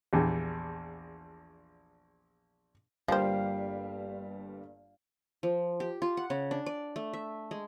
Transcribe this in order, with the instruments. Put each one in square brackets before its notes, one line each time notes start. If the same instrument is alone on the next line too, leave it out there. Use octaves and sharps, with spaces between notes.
[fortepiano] A#1 E2 G4
[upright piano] G1 G2 [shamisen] F3 C5 [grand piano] G3 A#3 G4 [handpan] F5
[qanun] F3
G4
F4
F#5
C#3
D4
D5
A3
E5
G#3